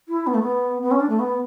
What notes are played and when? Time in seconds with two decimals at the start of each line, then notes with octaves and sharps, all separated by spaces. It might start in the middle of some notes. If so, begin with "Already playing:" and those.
0.08 E4
0.27 B3
0.34 A3
0.42 B3
0.82 B3
0.91 C#4
1.00 D4
1.09 A3
1.19 B3